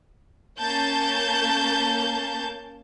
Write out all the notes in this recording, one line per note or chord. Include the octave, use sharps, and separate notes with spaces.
A#3 C#4 A5 G6